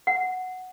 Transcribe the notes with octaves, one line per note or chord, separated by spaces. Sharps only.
F#5